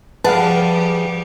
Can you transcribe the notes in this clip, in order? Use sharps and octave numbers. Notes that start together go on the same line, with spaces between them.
F3 G3 G4 G#4 B4 F5 F#5 A5